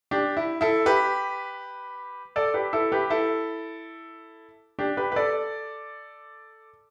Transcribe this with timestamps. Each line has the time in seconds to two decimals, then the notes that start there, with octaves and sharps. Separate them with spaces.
0.11 D4 G4
0.37 E4
0.61 E4 A4
0.86 G4 B4
2.36 A4 D5
2.54 G4 B4
2.73 E4 A4
2.92 G4 B4
3.10 E4 A4
4.79 D4 G4
4.97 G4 B4
5.12 B4
5.16 A4 D5